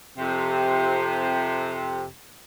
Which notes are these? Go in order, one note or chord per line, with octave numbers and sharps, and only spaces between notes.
F2 C3